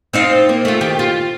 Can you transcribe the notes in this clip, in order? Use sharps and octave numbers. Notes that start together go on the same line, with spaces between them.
C4 D#4 F4
A#3
A3 F4
D#3 G4
F4